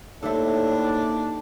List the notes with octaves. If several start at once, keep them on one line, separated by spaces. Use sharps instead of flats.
D#2 A2 D4 A4 C5 E5